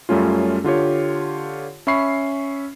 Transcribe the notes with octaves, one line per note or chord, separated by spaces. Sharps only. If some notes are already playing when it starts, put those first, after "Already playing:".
F#2 G3 A3 C#4 F4
D3 F4 G4 C#5
C#4 E5 B5 C#6 C7